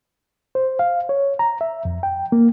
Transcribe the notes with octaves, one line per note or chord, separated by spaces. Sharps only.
C5
F5
C#5
A#5
E5
F2
G5
A#3